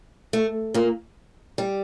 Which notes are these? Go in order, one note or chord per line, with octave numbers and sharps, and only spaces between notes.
A3
A#2 A#3
G3